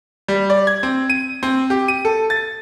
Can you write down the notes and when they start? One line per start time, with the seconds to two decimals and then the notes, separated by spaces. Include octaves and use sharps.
0.28 G3
0.50 D5
0.67 G#6
0.83 C4
1.10 D#7
1.43 C4
1.70 G4
1.88 D#7
2.05 A4
2.30 A6